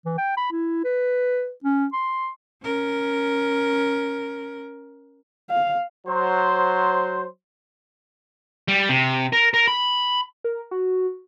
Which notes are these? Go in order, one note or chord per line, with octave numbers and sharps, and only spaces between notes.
E3
G5
B5
E4
B4
C#4
C6
C#4 A#4
F5
F#3 C5
G3
C3
A#4
A#4
B5
A#4
F#4